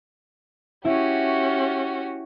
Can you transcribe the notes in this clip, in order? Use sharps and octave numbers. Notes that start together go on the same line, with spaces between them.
C#4 E4 F#4 G4